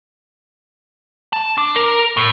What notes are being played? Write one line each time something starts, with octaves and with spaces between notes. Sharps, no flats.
A5
D4
A#4
A2